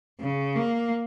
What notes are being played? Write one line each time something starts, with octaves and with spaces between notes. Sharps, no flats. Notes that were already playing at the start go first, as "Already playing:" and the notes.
C#3
A#3